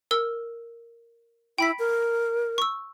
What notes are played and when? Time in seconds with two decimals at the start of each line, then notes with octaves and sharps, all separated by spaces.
0.11 A#4 E6
1.58 E4 G5 B5 B6
1.79 A#4
2.58 C#6 E6